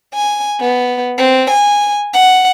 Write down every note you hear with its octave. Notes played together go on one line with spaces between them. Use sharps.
G#5
B3
C4
G#5
F#5